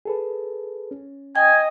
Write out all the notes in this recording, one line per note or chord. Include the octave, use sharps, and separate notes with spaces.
G#4 A4 B4
C#4
D#5 G5 G#5